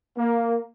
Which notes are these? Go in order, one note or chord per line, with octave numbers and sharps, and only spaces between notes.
A#3